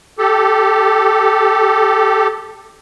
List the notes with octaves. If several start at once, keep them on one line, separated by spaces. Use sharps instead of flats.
G4 A4